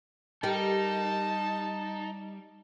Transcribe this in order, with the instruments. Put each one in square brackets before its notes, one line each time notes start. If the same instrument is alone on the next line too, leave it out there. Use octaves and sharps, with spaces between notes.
[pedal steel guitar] G3 [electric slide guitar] D#4 [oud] G4 A#4 [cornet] A5